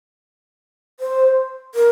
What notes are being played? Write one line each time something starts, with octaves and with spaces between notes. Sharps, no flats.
C5
A#4